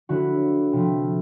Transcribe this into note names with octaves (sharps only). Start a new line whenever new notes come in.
D3 F#3 A3 E4 F#4
C3 F3 A3